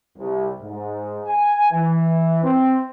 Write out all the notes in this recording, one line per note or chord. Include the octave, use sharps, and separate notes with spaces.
C2
G#2
G#5
E3
C4